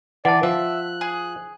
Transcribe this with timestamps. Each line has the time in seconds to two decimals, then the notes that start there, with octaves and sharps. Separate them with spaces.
0.25 E3 D5 F#5 A5
0.43 F3 E5 F#6
1.01 G#4